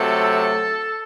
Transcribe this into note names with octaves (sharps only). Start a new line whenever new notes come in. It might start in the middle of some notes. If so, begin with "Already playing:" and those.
Already playing: C3 F#3 A3 A4